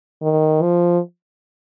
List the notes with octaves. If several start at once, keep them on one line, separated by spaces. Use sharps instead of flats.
D#3
F3